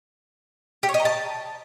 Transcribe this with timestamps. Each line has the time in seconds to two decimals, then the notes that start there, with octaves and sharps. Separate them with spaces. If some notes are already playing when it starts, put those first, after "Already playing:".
0.83 G4
0.89 C#5
0.94 D#5
1.00 A#5
1.05 A5